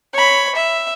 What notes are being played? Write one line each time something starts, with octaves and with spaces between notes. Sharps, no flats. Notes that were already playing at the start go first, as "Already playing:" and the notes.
C#5 B5
E5